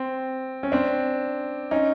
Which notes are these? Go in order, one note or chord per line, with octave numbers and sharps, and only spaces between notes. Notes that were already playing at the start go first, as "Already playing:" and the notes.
Already playing: C4
C#4
C4 D4
C#4 D#4